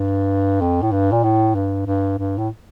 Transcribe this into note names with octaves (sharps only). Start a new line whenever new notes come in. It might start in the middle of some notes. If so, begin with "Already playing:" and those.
Already playing: G2
F2
A2
G2
A#2
A2
G2
G2
G2
A2